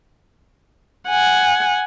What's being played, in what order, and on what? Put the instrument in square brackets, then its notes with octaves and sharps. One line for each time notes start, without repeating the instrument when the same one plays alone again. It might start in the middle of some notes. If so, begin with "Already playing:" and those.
[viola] F#5 G#5